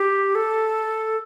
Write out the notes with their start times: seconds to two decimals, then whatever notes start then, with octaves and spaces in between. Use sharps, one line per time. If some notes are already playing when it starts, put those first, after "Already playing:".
Already playing: G4
0.35 A4